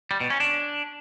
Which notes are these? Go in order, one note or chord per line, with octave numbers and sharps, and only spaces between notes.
G3
B2
C#4
D4